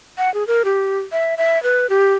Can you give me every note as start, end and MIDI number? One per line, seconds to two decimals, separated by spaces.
0.18 0.32 78
0.34 0.46 68
0.47 0.63 70
0.65 1.00 67
1.12 1.35 76
1.37 1.61 76
1.63 1.89 71
1.90 2.15 67